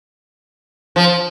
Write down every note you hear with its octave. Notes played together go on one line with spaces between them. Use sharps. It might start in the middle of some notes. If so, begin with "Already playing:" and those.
F3